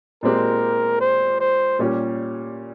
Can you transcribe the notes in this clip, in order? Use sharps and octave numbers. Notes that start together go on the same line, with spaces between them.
A#2 G#3 C4 G4 A#4
C5
C5
A#2 G3 C#4 G4